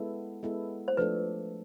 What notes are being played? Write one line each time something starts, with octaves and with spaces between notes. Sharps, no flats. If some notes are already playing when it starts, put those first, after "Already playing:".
Already playing: G#3 B3 E4 A4
G#3 B3 E4 A4
C5
F3 A3 D4 A4 B4